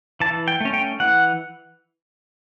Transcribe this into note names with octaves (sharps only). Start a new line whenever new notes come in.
E3 A5
G5
A3 C#4
G5
E3 F#5